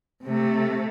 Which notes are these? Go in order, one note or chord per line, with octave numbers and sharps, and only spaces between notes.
C3 A3